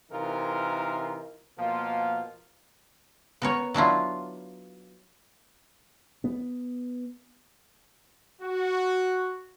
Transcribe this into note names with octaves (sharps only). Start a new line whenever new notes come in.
C3 E3 D#4 F4 A#4
B2 F3 A#3 F4
B3 A#4 C#5
F#3 D4 E4 F4
B3
F#4